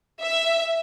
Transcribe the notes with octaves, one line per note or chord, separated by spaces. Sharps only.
E5